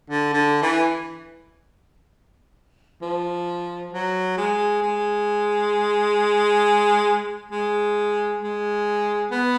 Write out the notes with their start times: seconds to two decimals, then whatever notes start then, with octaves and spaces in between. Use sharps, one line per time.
0.10 D3
0.33 D3
0.62 E3
3.02 F3
3.93 F#3
4.38 G#3
4.83 G#3
7.51 G#3
8.42 G#3
9.31 B3